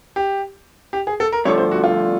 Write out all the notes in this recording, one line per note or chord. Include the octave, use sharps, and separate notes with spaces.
G4
G4
G#4
A4
A#4
G2 D3 F3 A3 C#5
C5
F#4
F4